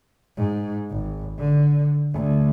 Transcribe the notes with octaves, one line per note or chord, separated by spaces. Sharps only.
G#2
G#1
D3
D2